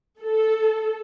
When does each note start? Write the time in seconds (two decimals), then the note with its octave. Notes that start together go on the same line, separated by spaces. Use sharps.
0.21 A4